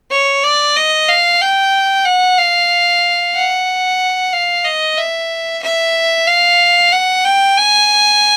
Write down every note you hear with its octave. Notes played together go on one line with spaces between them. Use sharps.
C#5
D5
D#5
F5
G5
F#5
F5
F#5
F5
D#5
E5
E5
F5
F#5
G5
G#5